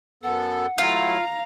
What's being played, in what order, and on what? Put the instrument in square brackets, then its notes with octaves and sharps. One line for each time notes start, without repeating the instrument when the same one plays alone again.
[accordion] F#2 B3 A4 [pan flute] F#5
[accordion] F#3 A3 E4 [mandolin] F4 [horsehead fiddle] F5 A#5